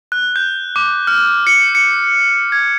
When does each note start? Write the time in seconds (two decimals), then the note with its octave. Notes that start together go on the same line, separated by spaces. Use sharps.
0.12 F#6
0.36 G6
0.76 D6
1.07 F6
1.47 C#7
1.75 C#7
2.52 G#6